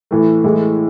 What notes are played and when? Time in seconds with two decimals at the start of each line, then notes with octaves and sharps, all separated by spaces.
0.11 A2 E3 A3
0.44 A2 E3 G#3